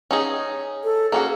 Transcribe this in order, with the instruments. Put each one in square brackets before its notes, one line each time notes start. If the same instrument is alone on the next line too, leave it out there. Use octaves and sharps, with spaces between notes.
[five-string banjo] C#4 D#4 G#4
[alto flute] A4
[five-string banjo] A#3 C#4 F#4 [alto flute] G#4